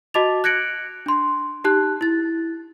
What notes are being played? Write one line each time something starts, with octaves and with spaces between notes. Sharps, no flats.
F#4 D#5 A5 D6 A6 F7
F#6 G#6 A#6 C#7 D7 F#7
D4 C6
D#4 G4 A5 F#6
E4 A6